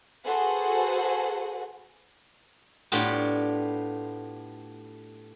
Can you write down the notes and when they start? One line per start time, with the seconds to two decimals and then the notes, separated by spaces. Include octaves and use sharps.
0.24 F#4 G#4 A4 B4 C5 F#5
2.92 A2 B3 D4 F4 G4